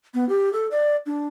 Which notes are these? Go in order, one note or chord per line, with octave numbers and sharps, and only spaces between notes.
B3
G4
A4
D5
D4